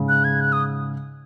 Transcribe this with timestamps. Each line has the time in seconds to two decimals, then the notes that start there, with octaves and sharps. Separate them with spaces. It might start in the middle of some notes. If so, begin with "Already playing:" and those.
Already playing: G#2 C#3
0.09 F#6
0.24 G#6
0.41 F#6
0.52 D#6